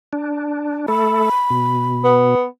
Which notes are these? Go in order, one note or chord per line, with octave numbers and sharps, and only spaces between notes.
D4
A3 A4 B5
B2
B3